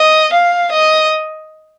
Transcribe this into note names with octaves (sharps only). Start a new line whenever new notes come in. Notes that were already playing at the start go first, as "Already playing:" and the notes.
Already playing: D#5
F5
D#5